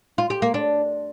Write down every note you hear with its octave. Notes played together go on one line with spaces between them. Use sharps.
F4
G4
A#3
D4